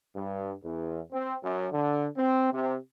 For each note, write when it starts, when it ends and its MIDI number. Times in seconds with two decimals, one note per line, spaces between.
0.15 0.53 43
0.63 1.00 40
1.12 1.36 60
1.43 1.67 42
1.72 2.07 50
2.16 2.51 60
2.52 2.76 48